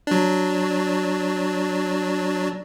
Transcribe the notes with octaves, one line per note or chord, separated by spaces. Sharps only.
F#3 D4